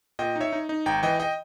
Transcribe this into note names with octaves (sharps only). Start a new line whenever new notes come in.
A#2 D#5 G5
D#4 C#5 E5
D#4
D#4
G#1 G5 A#5
E3 D#5 G5
D#5 G5